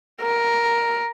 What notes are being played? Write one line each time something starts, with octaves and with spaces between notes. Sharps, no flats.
A#4